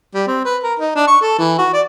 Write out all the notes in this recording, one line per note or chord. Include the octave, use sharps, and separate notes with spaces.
G3
C4
B4
A#4
D#4
D4
C#6
A4
E3
F#4
D5